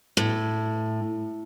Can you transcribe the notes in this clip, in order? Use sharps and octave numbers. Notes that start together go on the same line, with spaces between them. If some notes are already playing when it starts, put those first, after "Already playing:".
A2